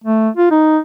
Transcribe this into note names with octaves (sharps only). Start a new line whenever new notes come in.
A3
F4
D#4